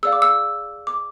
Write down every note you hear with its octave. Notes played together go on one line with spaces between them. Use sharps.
G#4 D5 F5 E6
D6
E6
D6